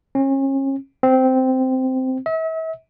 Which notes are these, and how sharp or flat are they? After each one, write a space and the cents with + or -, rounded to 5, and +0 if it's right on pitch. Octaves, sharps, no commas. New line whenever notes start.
C#4 -35
C4 -10
E5 -40